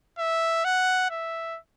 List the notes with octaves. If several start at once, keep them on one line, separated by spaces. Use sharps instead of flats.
E5
F#5
E5